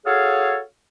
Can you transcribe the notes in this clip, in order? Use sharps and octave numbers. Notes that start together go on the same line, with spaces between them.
F#4 G#4 A4 C#5 F5